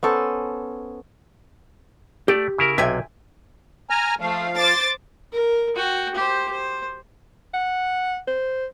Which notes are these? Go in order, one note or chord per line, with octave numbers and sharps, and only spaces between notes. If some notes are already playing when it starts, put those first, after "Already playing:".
B3 C#4 A4 C5
A3 G4 D5
C#3 E4 A#4
B1 C3 E5 G5 G#5
G#5 A#5 F6
F3 A3 F5
C5 D6 A6
A#4
F#4 G5
G4 C5
C5
F#5
C5